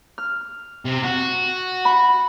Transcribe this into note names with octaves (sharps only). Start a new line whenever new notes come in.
F6
C3
F#4
B5